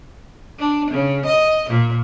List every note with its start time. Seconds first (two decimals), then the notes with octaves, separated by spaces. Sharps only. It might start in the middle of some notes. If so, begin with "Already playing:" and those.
0.59 D4
0.91 C#3
1.26 D#5
1.70 A#2